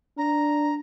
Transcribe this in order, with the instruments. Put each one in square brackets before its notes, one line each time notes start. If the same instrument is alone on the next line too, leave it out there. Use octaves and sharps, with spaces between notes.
[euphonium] D4 [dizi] A#5